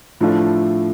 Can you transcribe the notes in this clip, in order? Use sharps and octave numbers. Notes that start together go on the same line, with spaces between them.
A2 F3 A3 D4 F4